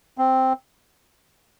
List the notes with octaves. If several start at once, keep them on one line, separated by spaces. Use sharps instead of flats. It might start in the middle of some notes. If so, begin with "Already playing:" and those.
C4